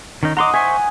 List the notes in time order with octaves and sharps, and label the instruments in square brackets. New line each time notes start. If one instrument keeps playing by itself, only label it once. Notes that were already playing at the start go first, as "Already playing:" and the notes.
[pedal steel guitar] D#3 C#4 D#4
[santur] D#5 F#5 [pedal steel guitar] A#5 C6 D6
[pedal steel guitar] C5 E5 C#6 [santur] G#5